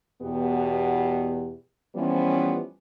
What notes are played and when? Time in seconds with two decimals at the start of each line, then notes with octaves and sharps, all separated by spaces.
0.22 E2 B2 B3 G4
1.95 E3 F3 G3 B3 C#4